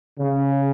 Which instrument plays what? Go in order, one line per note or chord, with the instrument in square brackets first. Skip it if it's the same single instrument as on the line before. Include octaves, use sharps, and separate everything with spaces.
[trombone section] C#3